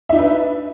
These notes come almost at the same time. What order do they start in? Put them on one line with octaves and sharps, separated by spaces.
E5 D#4 D4 B4